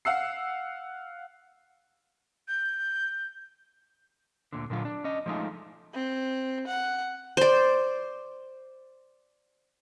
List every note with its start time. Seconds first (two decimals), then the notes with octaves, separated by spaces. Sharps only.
0.05 F5 F#5 E6 C7
2.48 G6
4.53 D2 A#2 D3
4.70 A#2 D3 F#3 F4
4.85 D4
5.04 C#4 D#5
5.26 F3 G#3 A3 D#4 F4
5.94 C4
6.67 F#5
7.37 C5 D5